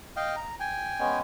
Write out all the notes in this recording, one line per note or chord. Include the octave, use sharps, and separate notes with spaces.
D#5 F5 G5
A#5
G5 G#5
G#3 B3 C#4